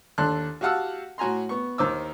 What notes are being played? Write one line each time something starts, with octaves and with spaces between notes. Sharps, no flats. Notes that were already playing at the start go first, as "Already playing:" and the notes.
D#2 D4 A4 A5 C6 F#6
F#4 G4 F5 F#5 A5 E6
A2 F#4 G#5 A#5 C6
B3 C#6
D#2 D#3 C5 D6 E6